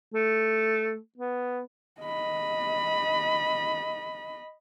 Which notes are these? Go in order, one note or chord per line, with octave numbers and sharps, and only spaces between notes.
A3
B3
D#5 B5